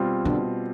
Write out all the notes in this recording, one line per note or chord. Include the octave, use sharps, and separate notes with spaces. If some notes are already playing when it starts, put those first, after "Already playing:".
Already playing: B2 G3 C4 F4
B2 D3